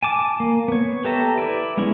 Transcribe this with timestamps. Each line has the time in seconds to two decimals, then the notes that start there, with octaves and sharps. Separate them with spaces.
0.03 G#5 A5 D6
0.40 A#3
0.68 B3 C#5
1.05 G4 A4 B4 E5 A#5
1.38 E4 B4 D5
1.77 G#3 B3 C#4 E4